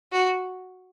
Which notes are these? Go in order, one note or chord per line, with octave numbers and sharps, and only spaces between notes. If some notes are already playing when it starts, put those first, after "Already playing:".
F#4